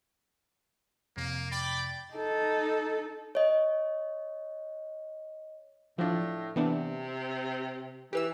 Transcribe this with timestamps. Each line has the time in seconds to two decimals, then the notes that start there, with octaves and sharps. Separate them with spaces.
1.17 F2 C3 A#3
1.51 D5 G5 B5 D6
2.14 D#4 A4
3.35 C#5 D#5
5.98 A2 F3 D4
6.56 C3 E3 B3 D4
8.13 E3 G4 B4 E6